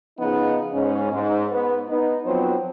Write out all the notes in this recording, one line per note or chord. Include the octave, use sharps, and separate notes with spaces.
C#3 F3 B3 D#4
G#2 C#4
G#2
B3
B3 D#4
F3 F#3 B3 C4 C5 C#5